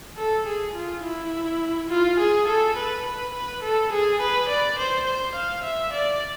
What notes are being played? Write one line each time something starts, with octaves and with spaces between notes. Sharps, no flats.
A4
G#4
F4
E4
F4
G#4
A4
B4
B4
B4
A4
G#4
B4
D5
C5
C5
F5
E5
D5